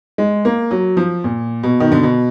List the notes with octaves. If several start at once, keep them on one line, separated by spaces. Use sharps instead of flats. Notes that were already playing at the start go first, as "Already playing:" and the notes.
G#3
A#3
F#3
F3
A#2
B2
D#3
D3
B2